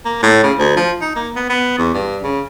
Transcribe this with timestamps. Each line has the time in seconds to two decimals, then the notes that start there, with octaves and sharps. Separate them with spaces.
0.05 A#3
0.23 A2
0.43 C#3
0.58 D2
0.77 F3
1.01 D#4
1.16 A#3
1.36 B3
1.49 B3
1.78 E2
1.94 G2
2.23 C#3